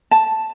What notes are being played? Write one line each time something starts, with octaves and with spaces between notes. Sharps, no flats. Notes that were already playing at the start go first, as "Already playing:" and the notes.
A5